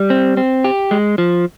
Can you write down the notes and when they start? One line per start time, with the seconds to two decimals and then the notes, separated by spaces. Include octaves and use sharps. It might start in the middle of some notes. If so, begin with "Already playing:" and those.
Already playing: G3
0.10 C4
0.37 C4
0.64 G4
0.91 G#3
1.18 F3